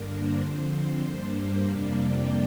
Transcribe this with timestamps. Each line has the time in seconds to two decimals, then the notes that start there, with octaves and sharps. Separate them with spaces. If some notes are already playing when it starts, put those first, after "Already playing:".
Already playing: G2 D3 A#3 D4 A#4
0.08 C5
0.38 D3 F3 C4
1.02 G2 G3 A#3 D4 C5
1.63 F2 C3 G3 A#3 D4 D5
1.94 G5